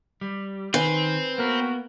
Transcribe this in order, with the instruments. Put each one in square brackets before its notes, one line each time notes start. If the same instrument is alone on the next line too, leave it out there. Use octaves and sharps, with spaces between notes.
[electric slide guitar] G3
[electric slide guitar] D#3 [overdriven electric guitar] C4 [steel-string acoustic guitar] B4 G#5
[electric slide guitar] A#3 B3 [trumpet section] F#4 A#4